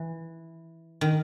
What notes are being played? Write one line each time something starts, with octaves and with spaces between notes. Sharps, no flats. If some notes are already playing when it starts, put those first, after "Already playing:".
Already playing: E3
D#3